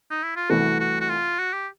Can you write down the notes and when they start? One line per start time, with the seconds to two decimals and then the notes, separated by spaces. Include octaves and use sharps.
0.10 D#4
0.23 E4
0.36 F4
0.50 C2 C3 E3 A3 F#4
0.80 F#4
1.01 F#4
1.09 F4
1.39 F#4
1.53 G4